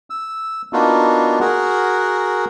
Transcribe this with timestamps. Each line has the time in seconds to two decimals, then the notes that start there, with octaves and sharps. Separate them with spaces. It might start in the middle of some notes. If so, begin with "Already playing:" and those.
0.10 E6
0.73 A#3 B3 D4 D#4 F4 F#4
1.40 F#4 G#4 A#4 F#5